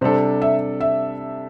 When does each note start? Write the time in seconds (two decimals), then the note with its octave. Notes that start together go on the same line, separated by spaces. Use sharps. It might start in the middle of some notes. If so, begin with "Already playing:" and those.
0.01 C3 G3 D4 A4 C5
0.42 E5
0.80 E5